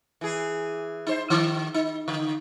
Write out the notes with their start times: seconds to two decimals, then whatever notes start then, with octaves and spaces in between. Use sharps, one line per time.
0.21 E3 G#4
1.07 D#4 C5
1.30 D#3
1.74 D#4
2.08 D3